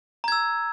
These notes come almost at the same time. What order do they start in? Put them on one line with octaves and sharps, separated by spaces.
A#5 G#6 E6